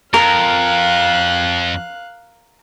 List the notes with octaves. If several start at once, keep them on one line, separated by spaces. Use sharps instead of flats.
F2 A#4 F5 F#6